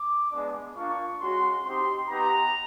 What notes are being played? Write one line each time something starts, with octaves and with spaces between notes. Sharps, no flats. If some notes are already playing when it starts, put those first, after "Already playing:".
Already playing: D6
G#3 B3 D4
A#3 D4 F4 C#6
G#3 C#4 F#4 C6
C4 D#4 G4 C6
B3 D#4 G4 A#5